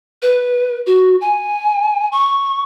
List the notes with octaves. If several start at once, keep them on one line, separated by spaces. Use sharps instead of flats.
B4
F#4
G#5
C#6